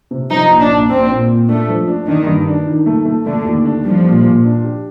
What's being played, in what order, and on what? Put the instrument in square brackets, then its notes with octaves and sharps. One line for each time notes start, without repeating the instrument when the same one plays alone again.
[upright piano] C3
[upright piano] F3 [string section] D#4
[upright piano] A#1
[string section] D4
[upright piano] A#1
[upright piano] A#1 [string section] C4
[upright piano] A#2
A#2
[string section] A3 [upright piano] D4
[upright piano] F3
D4
[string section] D#3 [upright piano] D4
[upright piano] G2
D4
D#3
A3
A3
[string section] D3 [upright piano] A3
[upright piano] D#2
D4
[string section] F3 [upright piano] G3
[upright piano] A#2
A#2
D4
G4